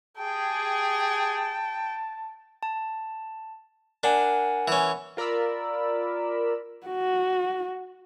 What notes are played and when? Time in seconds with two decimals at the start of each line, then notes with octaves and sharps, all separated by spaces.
0.18 G4 G#4 G5 A5
2.63 A5
4.04 D4 A#4 F#5 G#5
4.68 E3 C#4
5.17 F4 A#4 D5 B5 E6
6.87 F#4